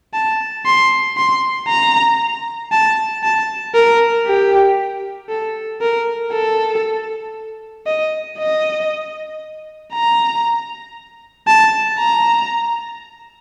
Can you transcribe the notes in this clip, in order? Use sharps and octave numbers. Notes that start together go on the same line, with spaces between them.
A5
C6
C6
A#5
A5
A5
A#4
G4
A4
A#4
A4
D#5
D#5
A#5
A5
A#5